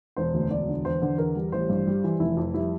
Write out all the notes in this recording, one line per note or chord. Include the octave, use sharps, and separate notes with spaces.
E1 C5
D2
E1 D5
D3
E2 C5
D3
E2 A#4
G3
A1 C5
G2
G3
E3
F1 E4
F2
G3 E4